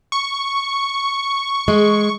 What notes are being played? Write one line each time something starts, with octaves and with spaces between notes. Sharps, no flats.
C#6
G#3